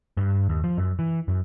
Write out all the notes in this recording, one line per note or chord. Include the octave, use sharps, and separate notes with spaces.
G2
D#2
F3
F#2
E3
F#2